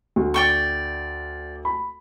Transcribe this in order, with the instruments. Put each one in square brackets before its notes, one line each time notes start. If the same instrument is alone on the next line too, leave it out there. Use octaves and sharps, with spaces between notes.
[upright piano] D2
[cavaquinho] D5 G5 C#6
[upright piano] B5